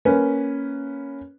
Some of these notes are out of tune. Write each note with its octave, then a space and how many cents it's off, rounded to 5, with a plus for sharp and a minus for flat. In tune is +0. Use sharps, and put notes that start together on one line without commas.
A#3 +0 C#4 +0 B4 +0